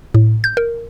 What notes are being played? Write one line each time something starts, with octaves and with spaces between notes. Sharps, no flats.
A2
G6
A#4